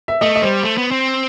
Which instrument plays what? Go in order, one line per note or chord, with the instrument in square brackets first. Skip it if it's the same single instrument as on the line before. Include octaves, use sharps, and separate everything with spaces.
[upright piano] E5
[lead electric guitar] A3 [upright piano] D#5
[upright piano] D#5
[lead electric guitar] G3 [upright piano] C5
[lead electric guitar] A3
B3
C4